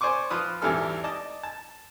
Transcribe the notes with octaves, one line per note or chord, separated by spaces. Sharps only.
C5 D5 G#5 C#6 D6
F3 F4 B4 D#6
G#1 E2 G3 D4 A4 F6
D5 D#5 A5
A5